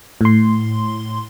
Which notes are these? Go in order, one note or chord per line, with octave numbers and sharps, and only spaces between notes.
A2 C6